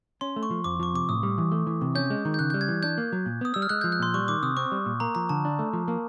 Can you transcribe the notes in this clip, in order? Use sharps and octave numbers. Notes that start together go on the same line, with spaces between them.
C#4 C6
A3
C#6
F3
F2 D6
F3 C#6
C3 D6
A2 D#6
G3
E3
A3
E3
C3
C#4 G6
G#3
D#3
G6
C#3 F#6
G3 G6
G#6
E3
D4 G6
A#3
F#3
A#2
B3 D#6
G3 E6
F6
G#3 F#6
F3 G6
F#6
A#2 C6
G3 C#6
D#3 D6
C3 D#6
C4 C#6
G3
A#2
A#3 A#5
F3 A#5
D3 A5
D4
A3
F3
A#3